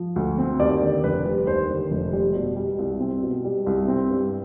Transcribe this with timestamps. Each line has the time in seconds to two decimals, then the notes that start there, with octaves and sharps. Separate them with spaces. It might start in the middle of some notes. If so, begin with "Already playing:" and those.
Already playing: F3
0.16 D2
0.38 C4
0.60 D#2 D5
0.82 D3
1.03 F1 B4
1.25 G3
1.47 D#2 C5
1.70 D3
1.91 F1
2.13 G3
2.35 B2
2.56 G3
2.79 C2
3.00 C4
3.23 B2
3.44 G3
3.66 C2
3.88 C4
4.10 G2